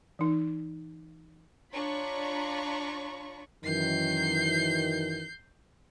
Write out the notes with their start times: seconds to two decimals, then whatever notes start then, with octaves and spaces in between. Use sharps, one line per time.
0.19 E3 D#4
1.72 D4 F4 C#5 A#5 B5 C#6
3.65 F#2 D#3 E3 G6 C7